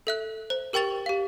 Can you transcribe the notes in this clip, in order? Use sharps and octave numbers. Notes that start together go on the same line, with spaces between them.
A4 E5 F#6
C5
G4 A#4 G5 C#6 A6 F7
G4 F5